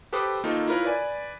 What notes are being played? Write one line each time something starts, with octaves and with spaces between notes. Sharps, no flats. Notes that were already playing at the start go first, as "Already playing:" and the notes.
G4 A4 B4 C5 D6 D#6
D#3 A#3 D#4 F4 A4
E4 F4 A#4 B4 C#5
B4 D5 G#5